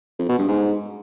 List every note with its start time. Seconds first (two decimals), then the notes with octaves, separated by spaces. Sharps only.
0.19 F2
0.29 B2
0.38 G2
0.48 G#2